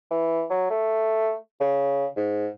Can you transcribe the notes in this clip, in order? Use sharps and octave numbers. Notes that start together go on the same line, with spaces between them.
E3
F#3
A3
C#3
G#2